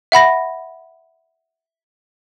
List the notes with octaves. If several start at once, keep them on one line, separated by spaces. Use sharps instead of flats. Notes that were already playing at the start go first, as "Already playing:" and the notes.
E5 F#5 B5 A#6